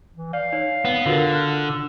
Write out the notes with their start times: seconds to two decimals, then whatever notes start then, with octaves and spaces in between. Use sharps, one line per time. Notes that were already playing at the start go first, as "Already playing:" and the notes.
0.16 E3
0.33 D5 F5
0.53 D#4 C#5
0.85 B3
1.06 D3 F4 F#4 A#4
1.33 F6 F#6